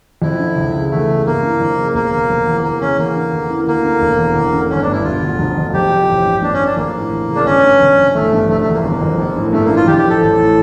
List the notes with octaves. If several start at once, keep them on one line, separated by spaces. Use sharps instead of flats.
F2 E4
D3
C#2
C#3
E2 A3
C#3
G2 A#3
E3
F2
C#3
E1 A#3
D2
F1
E2
E2 A#3
C#3 C#4
E2 A#3
D3
E2
E3
D2 A#3
D3
E1
E2
E2
D3
G1 C#4
G2 D4
E4
E1 F4
D2
F1
F2
F1 G4
F2
A1
G2
G2 D4
C#4
D3
D4
A#1 A#3
A2
E2
C#3
D4
G1 C#4
G2
F1
F2
A1 A3
G2
F1 A3
A3
E2
A#3
G1
F2
A#1
A2
G2 A3
A#3
E3
F4
F2 G4
G4
E3
A4
A1
A2